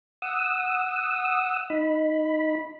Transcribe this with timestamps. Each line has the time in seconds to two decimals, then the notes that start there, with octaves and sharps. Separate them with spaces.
0.22 F#5 D#6 E6
1.70 D#4 B5